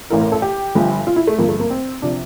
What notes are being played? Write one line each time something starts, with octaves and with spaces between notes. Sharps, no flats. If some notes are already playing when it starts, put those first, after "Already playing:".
A1 A2 E3 A#4
A#4
A4
G4
G1 G2 F3
F4
E4
A3
G1 G2 F3 A#3
A3
A#3
C4
C3 F3 D4